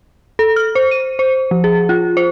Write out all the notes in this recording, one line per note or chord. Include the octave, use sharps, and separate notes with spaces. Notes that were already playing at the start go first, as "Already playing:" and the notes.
A4
F6
C5
D#7
C5
F3
G#4
F4
C5